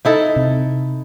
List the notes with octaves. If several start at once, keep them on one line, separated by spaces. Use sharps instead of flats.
D#4 E4 A4
C3